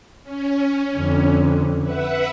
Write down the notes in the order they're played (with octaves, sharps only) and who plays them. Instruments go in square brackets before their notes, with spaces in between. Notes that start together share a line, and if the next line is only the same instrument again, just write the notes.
[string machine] C#4
[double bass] F2 D3
[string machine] B4 E5 F#5